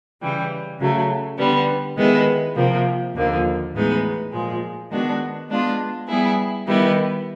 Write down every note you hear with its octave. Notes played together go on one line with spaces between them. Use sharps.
C#3 E3 G3
C#3 F#3 A3
D3 G3 B3
D#3 G#3 B3 E4
C3 F3 A#3
D#2 D3 F3 A#3
A2 E3 G#3 B3 D#4
A#2 F3 G#3
D#3 G#3 B3 D4 F#4
G#3 B3 D4 F4
G3 B3 E4 G#4
D#3 G3 B3 E4